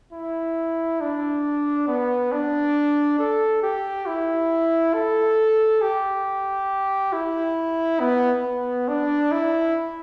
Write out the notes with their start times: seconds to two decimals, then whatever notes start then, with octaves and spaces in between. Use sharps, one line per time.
0.13 E4
1.01 D4
1.88 B3
2.32 D4
3.19 A4
3.63 G4
4.06 E4
4.94 A4
5.82 G4
7.13 E4
8.00 B3
8.44 B3
8.88 D4
9.32 E4